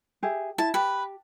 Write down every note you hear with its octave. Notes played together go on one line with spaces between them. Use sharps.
G4 G#4 E5
E4 A5
G4 B4